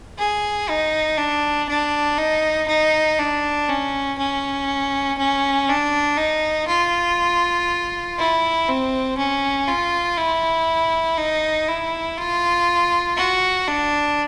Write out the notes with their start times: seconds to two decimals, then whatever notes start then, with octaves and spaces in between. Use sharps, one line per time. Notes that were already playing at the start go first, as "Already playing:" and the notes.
0.19 G#4
0.69 D#4
1.18 D4
1.69 D4
2.18 D#4
2.68 D#4
3.19 D4
3.69 C#4
4.18 C#4
5.18 C#4
5.69 D4
6.18 D#4
6.68 F4
8.18 E4
8.68 C4
9.18 C#4
9.68 F4
10.17 E4
11.18 D#4
11.68 E4
12.17 F4
13.17 F#4
13.68 D4